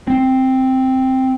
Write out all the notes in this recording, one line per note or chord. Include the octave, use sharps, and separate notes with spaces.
C4